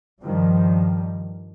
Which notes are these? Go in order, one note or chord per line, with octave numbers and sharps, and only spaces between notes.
G2 D#3 F3 G3